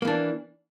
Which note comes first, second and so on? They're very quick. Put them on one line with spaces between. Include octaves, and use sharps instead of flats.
A#3 E3 D4